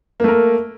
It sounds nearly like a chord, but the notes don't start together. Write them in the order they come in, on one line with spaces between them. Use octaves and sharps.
A#3 A3 A#4